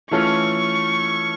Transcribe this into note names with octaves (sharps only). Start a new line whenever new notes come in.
E3 A3 C#4 F4 C#6